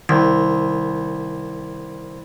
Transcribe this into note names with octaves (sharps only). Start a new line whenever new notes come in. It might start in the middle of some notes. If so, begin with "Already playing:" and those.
C2 D#3